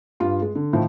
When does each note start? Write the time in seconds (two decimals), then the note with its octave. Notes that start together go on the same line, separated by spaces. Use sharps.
0.20 G2 F4
0.42 G#3
0.55 D3
0.73 A2 D#3 F3